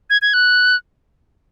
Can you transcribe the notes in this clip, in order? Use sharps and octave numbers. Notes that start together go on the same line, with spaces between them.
G#6
G#6
F#6